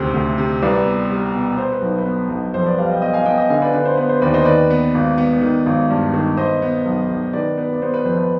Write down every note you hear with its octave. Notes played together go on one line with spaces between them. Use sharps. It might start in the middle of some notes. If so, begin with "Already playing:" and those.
Already playing: D2 C3 D#3 C5
D2
C3
C2 B4 D5
B3
G3
B2
B3 C5
B4
B1
B4
B3
B1
F2 C5
B4 D5
G3 D5 F5
D#5 G5
B3 D#5 G5
F5 G#5
B3 D#5 G5
D#5 G5
D3 F5 G#5
B4 D5
D3 B4
C5
B3 B4
C5
D#2 B4 D5
C5 D#5
D#3 B4 D5
B3
G#1
B3
D#3
G#1
G2
D#3
B3 C5 D#5
B3
B1
B1
D#3 B4 D5
B3 B4
D5
B3 C5
B4
F2 C5
B4